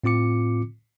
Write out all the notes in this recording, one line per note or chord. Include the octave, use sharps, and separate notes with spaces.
A2 C4 F4 D6 C#7